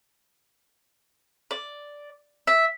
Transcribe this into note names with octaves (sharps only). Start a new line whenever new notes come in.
D5
E5